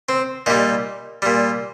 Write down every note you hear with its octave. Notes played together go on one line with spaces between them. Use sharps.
C4
A#2 G3 D#4
A#2 G3